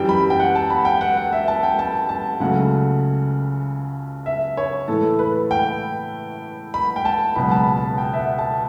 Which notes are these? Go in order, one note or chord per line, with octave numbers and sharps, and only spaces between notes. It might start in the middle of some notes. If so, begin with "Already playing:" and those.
Already playing: F#2 E3 G3 G5
B5
G5
F#5
A5
B5
G5
F#5
F#5
E5
A5
G5
A5
A5
C#2 C#3 F#3 A3 F#5
E5
C#5
A2 E3 A3 A4
B4
G5
B5
G5
A5
C#2 B2 F#3 B5
A5
B5
A5
G5
E5
F#5
A5